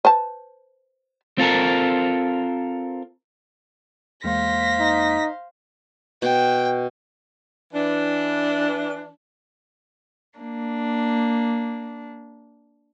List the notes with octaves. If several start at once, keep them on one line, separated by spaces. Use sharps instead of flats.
B4 C5 A5
C4 F4 A4 A#4
E2 G#3 A#3 C5 F5 A#6 B6
D#4
B2 G5
E3 D4
A#3 D4